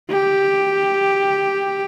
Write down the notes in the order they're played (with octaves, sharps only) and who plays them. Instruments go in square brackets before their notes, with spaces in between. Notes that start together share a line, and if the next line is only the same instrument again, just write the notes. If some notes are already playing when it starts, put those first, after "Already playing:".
[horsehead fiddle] G4